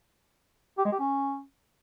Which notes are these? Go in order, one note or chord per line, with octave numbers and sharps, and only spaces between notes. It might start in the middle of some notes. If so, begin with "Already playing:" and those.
G4
G#3
G4
C#4